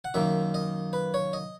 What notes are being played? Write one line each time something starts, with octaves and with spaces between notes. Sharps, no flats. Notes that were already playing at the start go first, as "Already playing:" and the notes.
F#5
F#2 D#3 A#3 E5
D#5
B4
C#5
D#5